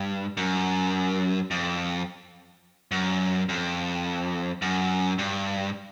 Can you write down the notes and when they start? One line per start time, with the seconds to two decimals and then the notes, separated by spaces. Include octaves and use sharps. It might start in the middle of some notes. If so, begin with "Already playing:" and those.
Already playing: G2
0.37 F#2
1.51 F2
2.92 F#2
3.49 F2
4.62 F#2
5.19 G2